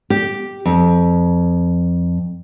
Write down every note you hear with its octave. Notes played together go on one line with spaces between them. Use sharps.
G4
F2